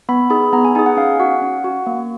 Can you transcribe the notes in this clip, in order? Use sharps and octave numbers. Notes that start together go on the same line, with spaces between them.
B3 B5
D#4 G#4 B5
B3 A#5
G#5
D#4 G#4 G#5
F#5
C#4 F5
F#4 F#5
C#4
F#4
A#3